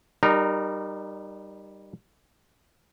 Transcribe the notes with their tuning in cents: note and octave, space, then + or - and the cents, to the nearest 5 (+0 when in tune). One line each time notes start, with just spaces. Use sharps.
G3 +0 D#4 -25 A#4 +0